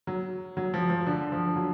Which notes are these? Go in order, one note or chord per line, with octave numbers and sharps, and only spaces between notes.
F#3
F#3
F3
F3
D3
F3
F#3